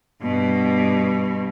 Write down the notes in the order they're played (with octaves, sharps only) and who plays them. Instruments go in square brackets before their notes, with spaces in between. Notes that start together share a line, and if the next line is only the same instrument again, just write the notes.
[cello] G2 B2